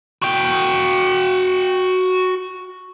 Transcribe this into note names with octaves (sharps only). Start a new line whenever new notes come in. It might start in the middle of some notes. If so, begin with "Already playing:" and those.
F#4 G5